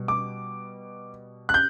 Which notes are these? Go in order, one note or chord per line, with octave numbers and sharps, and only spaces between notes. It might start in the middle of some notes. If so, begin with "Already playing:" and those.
Already playing: B2 G3
D6
F#6
G6